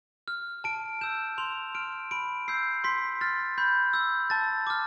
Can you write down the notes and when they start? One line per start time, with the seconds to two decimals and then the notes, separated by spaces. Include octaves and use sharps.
0.28 F6
0.64 A5 D7
1.01 E6 G6 E7
1.38 C6 F7
1.75 F6 D7
2.11 B5 D7
2.48 E6 G6 C7
2.84 C6 B6
3.21 F6 A6
3.58 B5 G6
3.94 E6 G6
4.30 A5 A6
4.67 D6 F6